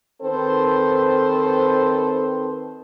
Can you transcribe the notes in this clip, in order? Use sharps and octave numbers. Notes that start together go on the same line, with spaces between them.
D#3 C4 A4 B4 C5